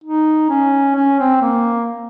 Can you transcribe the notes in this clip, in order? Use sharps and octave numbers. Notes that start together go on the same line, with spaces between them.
D#4
C#4
C#4
C4
A#3